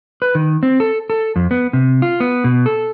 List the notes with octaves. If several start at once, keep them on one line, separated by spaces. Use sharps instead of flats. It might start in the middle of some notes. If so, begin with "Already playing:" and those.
B4
D#3
C4
A4
A4
F2
B3
C3
F4
B3
B2
A4